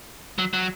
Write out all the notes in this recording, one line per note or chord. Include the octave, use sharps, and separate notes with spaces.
F#3
F#3